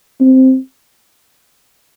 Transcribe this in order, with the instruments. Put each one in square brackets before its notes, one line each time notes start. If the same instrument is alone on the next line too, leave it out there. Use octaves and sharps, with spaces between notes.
[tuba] C4